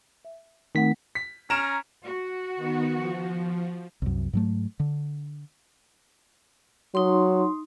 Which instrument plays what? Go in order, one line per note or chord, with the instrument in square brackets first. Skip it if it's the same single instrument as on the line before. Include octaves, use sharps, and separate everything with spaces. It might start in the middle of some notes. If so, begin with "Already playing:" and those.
[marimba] E5
[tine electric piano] D#3 B6 [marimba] A3 C4 F#5
[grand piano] B6
[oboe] C#4 [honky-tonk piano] A#5 [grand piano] F6 D7 E7
[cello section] F#4
[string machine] D#3 B3
F3
[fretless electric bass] C2 F#2
G#2 F#3 A3
D3
[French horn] F#3 [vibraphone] D#4 C6